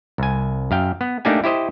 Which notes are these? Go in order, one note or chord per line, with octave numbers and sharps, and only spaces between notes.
C2 G#5
F#2 F5 G5
B3
A3 A#3 D4 D#4 G4 G#5
E4 G4 C5 D#5